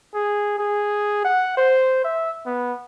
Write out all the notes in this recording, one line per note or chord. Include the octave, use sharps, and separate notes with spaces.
G#4
G#4
F#5
C5
E5
B3